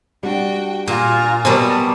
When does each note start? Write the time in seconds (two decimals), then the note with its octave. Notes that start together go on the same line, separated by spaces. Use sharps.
0.23 G3 D4 F#4 G5
0.88 A#2 F4 G#5 A#5
1.45 B2 F#3 G3 A#4 C5 A5